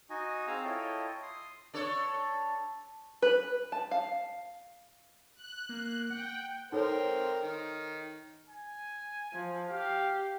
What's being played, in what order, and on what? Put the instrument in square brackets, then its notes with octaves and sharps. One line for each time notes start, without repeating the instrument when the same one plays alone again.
[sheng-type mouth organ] D#4 F#4 D#5 G#5
C4 G#4 F5 G#5 A#5 E6
E4 F4 A4 C#5 D#5 G5
C6 D#6
[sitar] D4 A4 C#5
[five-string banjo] B4
A5
F5
[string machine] F#6
[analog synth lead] A#3
[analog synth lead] F#5 [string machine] G5
[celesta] D#4 A4 C#5 [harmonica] A#4 C5 G5
[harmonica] D#3
[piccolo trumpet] G#5
[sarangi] F3
[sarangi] G4 [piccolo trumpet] F5